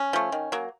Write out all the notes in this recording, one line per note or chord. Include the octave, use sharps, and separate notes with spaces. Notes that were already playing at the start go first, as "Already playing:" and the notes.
Already playing: C#4
F3 A3
D#3
F#3 A#3